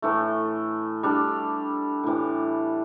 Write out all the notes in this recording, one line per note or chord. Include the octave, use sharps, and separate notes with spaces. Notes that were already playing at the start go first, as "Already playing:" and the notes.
A2 E3 A3
G3 D4 A4
A2 E3 G3